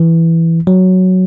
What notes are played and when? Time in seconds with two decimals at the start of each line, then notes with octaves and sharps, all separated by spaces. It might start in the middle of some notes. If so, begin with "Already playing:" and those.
Already playing: E3
0.67 F#3